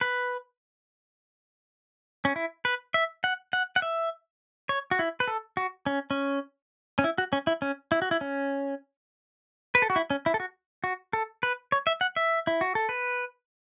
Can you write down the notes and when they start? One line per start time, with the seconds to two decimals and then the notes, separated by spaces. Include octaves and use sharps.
0.01 B4
2.25 C#4
2.36 E4
2.65 B4
2.94 E5
3.24 F#5
3.53 F#5
3.76 F#5
3.82 E5
4.69 C#5
4.91 F#4
4.99 E4
5.20 B4
5.28 A4
5.57 F#4
5.86 C#4
6.11 C#4
6.99 C#4
7.04 E4
7.18 F#4
7.33 C#4
7.47 E4
7.62 C#4
7.92 E4
8.02 F#4
8.11 E4
8.21 C#4
9.75 B4
9.82 A4
9.90 F#4
9.96 E4
10.10 C#4
10.26 E4
10.34 A4
10.40 F#4
10.84 F#4
11.13 A4
11.43 B4
11.72 C#5
11.87 E5
12.01 F#5
12.16 E5
12.47 E4
12.61 F#4
12.75 A4
12.89 B4